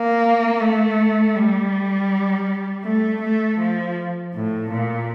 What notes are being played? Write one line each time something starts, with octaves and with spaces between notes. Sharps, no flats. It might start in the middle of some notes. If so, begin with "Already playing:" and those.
Already playing: A#3
A3
G3
A3
A3
F3
A2
A#2